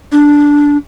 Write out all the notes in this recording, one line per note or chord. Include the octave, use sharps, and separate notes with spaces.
D4